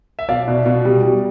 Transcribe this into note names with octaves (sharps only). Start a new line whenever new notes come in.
E5
B2 D5 F5
B2
B2
G3
G3